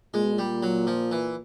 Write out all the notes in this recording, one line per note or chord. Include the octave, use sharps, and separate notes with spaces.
A#2 G#3
B2
A#2 G3
F#3
F3
E3